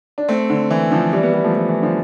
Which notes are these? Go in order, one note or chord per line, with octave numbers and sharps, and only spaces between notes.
D4
A3 C4
D3
E3
D3 F3
E3 G3
G3 B3
G3 B3
F3 A3
F3 A3
E3
D3 F3